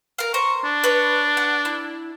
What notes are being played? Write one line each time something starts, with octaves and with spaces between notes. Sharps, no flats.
A#4 F5
C5 A#5 C#6
D4
B4 C#5
F#5
E4